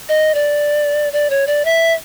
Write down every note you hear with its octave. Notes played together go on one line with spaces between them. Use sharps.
D#5
D5
D5
C#5
D5
E5